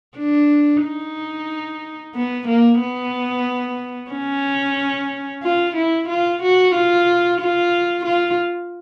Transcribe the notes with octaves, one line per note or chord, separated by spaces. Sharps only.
D4
D#4
B3
A#3
B3
C#4
F4
E4
F4
F#4
F4
F4
F4